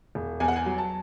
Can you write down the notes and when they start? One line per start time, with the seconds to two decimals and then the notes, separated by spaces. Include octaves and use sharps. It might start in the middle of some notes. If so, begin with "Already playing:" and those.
0.15 E1
0.40 E2 G#5
0.48 F#5
0.56 G#5
0.66 F#3
0.78 A5